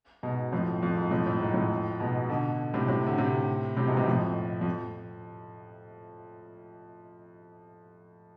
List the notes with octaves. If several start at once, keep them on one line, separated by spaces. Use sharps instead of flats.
G#2 B2
F2 A2
F2
G#2
F2 A2
A2
G#2
F2 A2
G#2 B2
B2 D3
A2 C3
A2 C3
D3
A2 C3
A2 C3
G#2 B2
A2 C3
F2 A2
F2